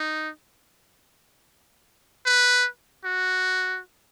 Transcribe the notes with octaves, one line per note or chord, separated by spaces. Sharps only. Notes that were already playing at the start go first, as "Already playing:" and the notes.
Already playing: D#4
B4
F#4